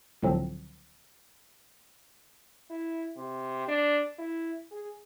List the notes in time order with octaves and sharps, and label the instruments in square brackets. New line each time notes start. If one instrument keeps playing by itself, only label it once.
[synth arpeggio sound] C#2 A2 D3 F3 F#3 C4
[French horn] E4
C3
D4
E4
G#4